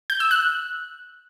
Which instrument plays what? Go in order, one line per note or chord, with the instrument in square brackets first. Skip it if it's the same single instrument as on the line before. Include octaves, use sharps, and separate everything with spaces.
[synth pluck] G6
E6
F#6